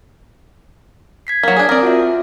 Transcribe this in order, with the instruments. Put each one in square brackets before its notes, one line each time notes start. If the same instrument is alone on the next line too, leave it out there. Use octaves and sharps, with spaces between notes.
[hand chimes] G#6 B6 C7
[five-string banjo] F#3 A#3
D4 G#4
[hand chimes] C4 D#6 [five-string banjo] A#4 D5
[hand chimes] F4 F#4 E5